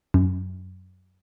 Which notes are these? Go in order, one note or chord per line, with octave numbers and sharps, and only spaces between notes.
F#2